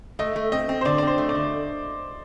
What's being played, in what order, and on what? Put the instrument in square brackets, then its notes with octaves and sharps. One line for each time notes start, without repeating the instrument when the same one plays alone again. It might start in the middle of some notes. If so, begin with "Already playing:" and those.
[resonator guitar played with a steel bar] A3 [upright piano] D#5
[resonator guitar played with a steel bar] A3
[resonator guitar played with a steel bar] C4 [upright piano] D#5
[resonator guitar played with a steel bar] C4
[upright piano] C5
[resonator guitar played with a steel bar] D3 [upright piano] D5
[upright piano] D5
[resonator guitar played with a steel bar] C4 [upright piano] C5
[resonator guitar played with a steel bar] A3
[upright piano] D5
[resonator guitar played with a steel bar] D3